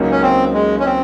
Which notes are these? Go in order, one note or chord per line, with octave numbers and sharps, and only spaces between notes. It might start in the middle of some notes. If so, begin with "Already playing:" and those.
Already playing: C#2 C#3 F#3 A#3 D#4
C#4
C4
G#3
C#4
C4